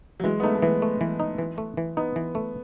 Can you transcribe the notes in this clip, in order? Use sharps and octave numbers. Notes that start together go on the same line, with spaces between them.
F#3
E3 G#3
B3
A3 D#4
A3
E3 B3
A3
E3
D#4
E3
A3
E3
B3 D#4
E3
A3